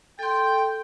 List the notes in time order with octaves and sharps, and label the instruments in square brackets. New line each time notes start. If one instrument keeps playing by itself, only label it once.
[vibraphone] A4 C6 [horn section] G5